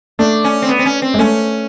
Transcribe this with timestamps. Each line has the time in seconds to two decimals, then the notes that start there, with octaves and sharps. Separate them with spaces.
0.19 A3 D4
0.44 C#4
0.62 C4
0.69 B3
0.79 C4
0.85 C#4
1.02 C4
1.14 G#3
1.18 A3 C#4